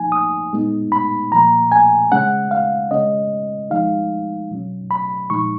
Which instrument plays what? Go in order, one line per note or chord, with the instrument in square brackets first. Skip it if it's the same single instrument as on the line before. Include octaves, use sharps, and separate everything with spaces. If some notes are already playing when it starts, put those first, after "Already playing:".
Already playing: [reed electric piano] F3 A#3 D#4 G#5
D#6
A#2 G#3 B3 D#4
B5
A#2 F3 A#3 A#5
G#5
C#3 G#3 C#4 F#5
F5
C#3 G#3 C#4 D#5
F3 G#3 D#4 F5
B2 F#3 C#4
B5
A#2 F3 G#3 D#4 C#6